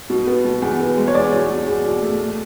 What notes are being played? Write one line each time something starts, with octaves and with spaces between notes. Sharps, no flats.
B2
B3
B2
E2
B3
G#3
C#5
E2 D5
B2
B2
E2
B2
A3
A3